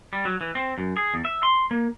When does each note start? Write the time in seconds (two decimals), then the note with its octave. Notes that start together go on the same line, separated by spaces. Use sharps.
0.13 G3
0.25 F#3
0.41 E3
0.55 C4
0.78 F#2
0.97 G#4
1.14 E2
1.25 E5
1.43 C6
1.71 A#3